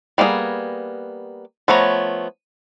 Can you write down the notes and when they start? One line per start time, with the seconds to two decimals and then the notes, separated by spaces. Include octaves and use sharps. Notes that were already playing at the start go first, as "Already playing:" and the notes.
0.18 G3 A#3 B3 D#4 G#4
1.68 F3 A3 B3 C#5 A#5